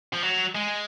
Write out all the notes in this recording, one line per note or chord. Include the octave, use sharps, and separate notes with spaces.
F3
F#3
G#3